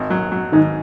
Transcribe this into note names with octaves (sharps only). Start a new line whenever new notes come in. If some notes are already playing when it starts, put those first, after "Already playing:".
Already playing: G#1
F#3
F#3
G#2 D#3